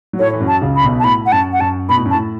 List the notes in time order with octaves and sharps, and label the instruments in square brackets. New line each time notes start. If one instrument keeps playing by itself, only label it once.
[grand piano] F#3
[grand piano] A2 A3 [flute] C#5
[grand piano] E3
F#2 F#3
[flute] A5
[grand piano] C#2 C#3
[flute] B5
[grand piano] B1 B2
[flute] A5
[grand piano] A2 [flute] B5
[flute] F#5
[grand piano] F#2 [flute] A5
[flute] F#5
[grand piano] F#2 [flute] A5
[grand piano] B2 [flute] B5
[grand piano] A2
F#2
[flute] A5
[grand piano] A2